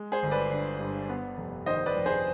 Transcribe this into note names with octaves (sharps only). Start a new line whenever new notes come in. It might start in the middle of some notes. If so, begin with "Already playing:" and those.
Already playing: G#3
G#4 C5
G1
B4 D5
D3
G2
B3
F1
D#3 C5 D#5
B4 D5
F2
G#4 C5